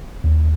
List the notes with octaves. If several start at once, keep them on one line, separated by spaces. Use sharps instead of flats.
D#2